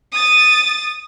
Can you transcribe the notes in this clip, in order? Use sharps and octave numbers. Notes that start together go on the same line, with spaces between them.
D#6 A6